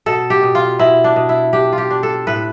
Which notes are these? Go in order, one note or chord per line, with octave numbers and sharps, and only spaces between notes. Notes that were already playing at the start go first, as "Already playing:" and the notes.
B2 A4
G4
B2
F4
B2 E4
D4
B2
E4
D4 G4
F4
G4
D4
A4
A2 B4